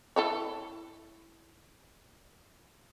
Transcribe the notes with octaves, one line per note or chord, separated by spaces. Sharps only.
E4 A4 C#5